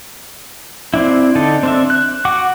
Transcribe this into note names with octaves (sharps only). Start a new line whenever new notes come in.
C4 D4 E4
D3 D#4 A4
C4 D4 E5
F#6
F#4 F#5 D6